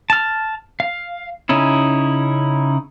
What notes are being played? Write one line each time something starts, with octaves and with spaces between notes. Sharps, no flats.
A5 F6
F5
C#3 C#4 D#4 E4